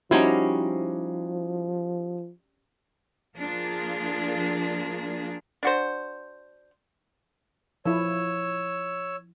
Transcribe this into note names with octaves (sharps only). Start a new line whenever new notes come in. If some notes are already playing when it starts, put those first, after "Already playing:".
F3 G3 C#4 D#4 E4 F#4 C5
F3 A#3 D4 F4 G#4 A#4
D4 F#4 C5
F3 E4 C#5 E6